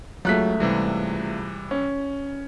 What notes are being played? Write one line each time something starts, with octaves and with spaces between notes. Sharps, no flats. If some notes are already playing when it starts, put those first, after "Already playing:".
C#2 F#3 A3 F#6 B6
C3 E3 G3
C#4